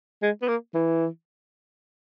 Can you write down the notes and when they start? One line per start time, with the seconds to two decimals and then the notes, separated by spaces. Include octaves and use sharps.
0.22 G#3
0.42 B3
0.48 A#3
0.74 E3